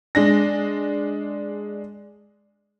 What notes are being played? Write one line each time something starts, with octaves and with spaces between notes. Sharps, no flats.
G#3 D4 A#6